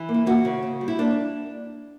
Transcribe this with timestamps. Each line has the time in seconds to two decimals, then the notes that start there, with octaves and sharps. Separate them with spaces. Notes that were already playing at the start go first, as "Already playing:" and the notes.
Already playing: E3
0.09 A#3
0.14 E4
0.26 A#3 F#4
0.45 C#3
0.63 C#3
0.81 G3
0.88 E4
0.99 A#3 D4